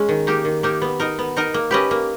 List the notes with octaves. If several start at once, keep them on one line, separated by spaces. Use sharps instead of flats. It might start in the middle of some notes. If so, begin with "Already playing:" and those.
Already playing: G#3 C#4
D#3
A#3 D#4 G4
D#3
A#3 D#4 G4
B3
D#4 A#4 D#5
B3
D#4 A#4 D#5
A#3
C#4 G4 B4 D#5
A#3